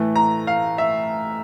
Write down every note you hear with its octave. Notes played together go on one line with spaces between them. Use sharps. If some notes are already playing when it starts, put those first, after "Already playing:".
Already playing: A2 E3 A3
A#5
F5
E5